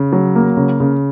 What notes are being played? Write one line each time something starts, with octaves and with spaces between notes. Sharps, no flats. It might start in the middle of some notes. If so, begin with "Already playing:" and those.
Already playing: C#3
F#3
A#3
C#3
C#3